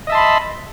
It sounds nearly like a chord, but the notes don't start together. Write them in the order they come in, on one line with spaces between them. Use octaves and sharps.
D#5 E5 A5 C6 B5